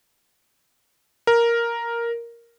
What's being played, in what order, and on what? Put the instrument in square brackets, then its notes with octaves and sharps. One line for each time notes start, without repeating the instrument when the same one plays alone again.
[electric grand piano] A#4